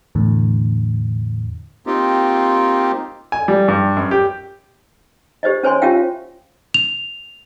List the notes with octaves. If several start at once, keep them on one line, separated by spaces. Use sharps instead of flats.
E2 A2 D3
A#3 C4 D#4 F4 G4
G#5
G3
G2
F#2
G4
G4 C5 D5 D#5
C#4 C5 C#5 G#5 C6
C#4 F4 G4 E5 F5 G5
F7